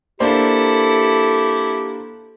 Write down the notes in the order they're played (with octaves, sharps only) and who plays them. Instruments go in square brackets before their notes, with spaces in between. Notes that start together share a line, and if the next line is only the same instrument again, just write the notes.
[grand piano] A#3 D4 C5 [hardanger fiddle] E4 A4 [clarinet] G4